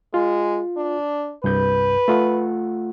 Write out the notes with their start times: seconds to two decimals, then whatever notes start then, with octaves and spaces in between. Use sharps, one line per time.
0.14 G#3 F4
0.77 D4
1.44 C2 G2 B4 G6
2.08 A3 F4 F#5